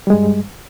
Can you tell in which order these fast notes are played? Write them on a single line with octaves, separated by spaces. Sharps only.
G3 G#3 G2